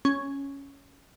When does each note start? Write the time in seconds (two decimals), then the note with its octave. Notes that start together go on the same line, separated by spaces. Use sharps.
0.05 C#4